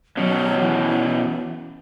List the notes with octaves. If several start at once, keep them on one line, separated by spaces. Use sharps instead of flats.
B2 F#3 C#4
E3